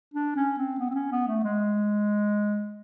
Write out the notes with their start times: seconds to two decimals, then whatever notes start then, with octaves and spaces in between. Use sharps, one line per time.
0.14 D4
0.36 C#4
0.58 C4
0.79 B3
0.90 C4
0.95 C#4
1.11 B3
1.27 A3
1.44 G#3